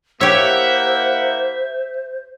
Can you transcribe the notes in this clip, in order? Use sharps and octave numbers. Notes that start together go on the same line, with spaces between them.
A#3 E4 G4 C5 C#5 E5 F#5